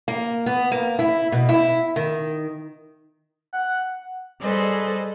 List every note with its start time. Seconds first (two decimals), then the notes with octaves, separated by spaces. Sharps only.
0.08 A#3
0.46 B3
0.72 A#3
0.99 E4
1.32 B2
1.49 E4
1.96 D#3
3.53 F#5
4.41 G3 G#4 A4 B4 C5 D#5